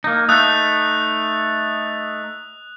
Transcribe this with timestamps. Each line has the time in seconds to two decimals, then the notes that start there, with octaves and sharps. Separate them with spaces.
0.04 A#3 D#4
0.29 A3 D#4 D#6 F#6